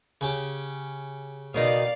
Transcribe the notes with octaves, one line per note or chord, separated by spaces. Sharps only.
C#3 C#4 G4
B2 D#3 D#4 D5 F5